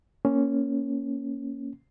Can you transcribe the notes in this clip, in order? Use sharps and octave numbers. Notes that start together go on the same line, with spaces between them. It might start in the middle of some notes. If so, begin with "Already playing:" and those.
A#3 C#4